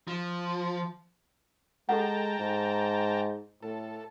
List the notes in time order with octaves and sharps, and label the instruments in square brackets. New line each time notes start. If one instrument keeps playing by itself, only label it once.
[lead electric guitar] F3
[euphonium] G#3 [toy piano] G4 A4 F#5 [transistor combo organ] G5 A5 A#5
[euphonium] G#2
[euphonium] A2 [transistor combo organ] A4